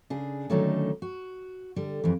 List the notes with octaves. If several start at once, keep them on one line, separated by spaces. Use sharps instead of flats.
C#3 D4 G#4
D3 D#3 F#3 A3 C#4 D#4
F#4
D3 G3
F2 E3